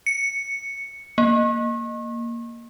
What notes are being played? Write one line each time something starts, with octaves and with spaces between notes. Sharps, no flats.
C#7
A#3